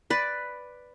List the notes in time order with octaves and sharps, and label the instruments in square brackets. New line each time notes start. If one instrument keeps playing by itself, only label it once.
[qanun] B4 D5